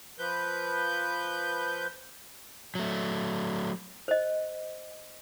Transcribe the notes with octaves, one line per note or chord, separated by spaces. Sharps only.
F3 B4 G6
F#3 A3
C5 D#5